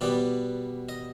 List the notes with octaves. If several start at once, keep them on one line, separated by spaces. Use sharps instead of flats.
B2 G3 B3 D5
D#5